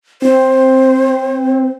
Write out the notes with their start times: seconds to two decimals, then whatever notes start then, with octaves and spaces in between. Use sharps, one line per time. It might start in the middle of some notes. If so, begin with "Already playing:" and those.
0.22 C4 C5